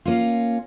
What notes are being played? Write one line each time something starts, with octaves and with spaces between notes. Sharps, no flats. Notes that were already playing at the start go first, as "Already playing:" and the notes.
A#3 C#4 F4